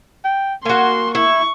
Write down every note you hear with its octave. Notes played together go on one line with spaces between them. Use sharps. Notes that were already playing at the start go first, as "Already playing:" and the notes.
G5
A#3 F#4 G#5 C6
E4 C#6